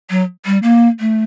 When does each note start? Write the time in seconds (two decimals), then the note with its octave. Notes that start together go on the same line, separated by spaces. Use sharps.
0.10 F#3
0.46 G3
0.63 A#3
1.00 A3